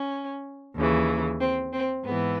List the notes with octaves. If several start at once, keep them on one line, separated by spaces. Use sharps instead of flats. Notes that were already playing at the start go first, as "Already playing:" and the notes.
Already playing: C#4
D#2 C#3 E3
C4
C4
G#2 E3 B3